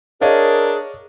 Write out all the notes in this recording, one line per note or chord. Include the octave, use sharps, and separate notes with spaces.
D4 G#4 A#4 C#5 D#5 F5